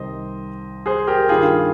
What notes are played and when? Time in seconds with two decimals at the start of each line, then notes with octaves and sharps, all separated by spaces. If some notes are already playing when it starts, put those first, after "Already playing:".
Already playing: C2 C3 D#3 C5 D#5
0.86 G#4 C5
1.07 G4 A#4
1.29 G2 D#3 G3 A#3 F4 G#4